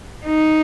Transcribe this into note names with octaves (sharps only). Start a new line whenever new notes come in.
D#4